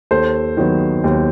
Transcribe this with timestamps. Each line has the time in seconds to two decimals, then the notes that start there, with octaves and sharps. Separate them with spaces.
0.11 D#2 A4 C5
0.57 D#3 F#3 B3
1.04 D#2